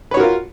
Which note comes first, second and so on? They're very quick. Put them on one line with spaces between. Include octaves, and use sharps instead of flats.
B4 C#5 F#4 A#4 F4